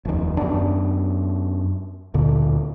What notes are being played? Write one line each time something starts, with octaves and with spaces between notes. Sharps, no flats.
F1 D#2
F#2 B3 D4
D2 A#2 D3